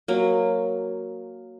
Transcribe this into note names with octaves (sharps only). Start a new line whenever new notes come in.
F#3 A#3